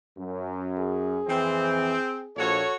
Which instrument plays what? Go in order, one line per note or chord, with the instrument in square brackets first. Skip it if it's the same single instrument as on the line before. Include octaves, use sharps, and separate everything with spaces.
[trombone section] F#2
[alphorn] G#4
[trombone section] F2 E3 [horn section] C4
[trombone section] A#1 [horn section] F#4 A4 C#5